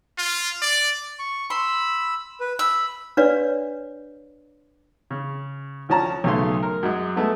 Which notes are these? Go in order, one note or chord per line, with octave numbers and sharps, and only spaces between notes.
F4
D5
C#6
B5 C6 E6
B4
B5 E6
D4 B4 C#5 D5 F5
C#3
D2 F3 C#4 A5 A#5
B1 C#3 A3 G#4 F5 C6
A#4
F#2 G#3
G#3 A3 B3